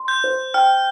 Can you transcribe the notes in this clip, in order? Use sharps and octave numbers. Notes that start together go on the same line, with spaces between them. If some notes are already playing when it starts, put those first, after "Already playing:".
Already playing: C6
G6
C5
G5 F6